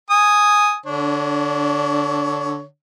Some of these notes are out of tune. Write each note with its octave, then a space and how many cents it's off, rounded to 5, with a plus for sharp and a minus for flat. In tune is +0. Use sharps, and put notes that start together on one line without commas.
G#5 +0 D#6 +0
D3 +0 D4 -20 C#5 +15